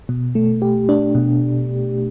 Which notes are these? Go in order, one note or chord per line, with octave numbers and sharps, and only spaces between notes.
B2
A3
G4
D4
B2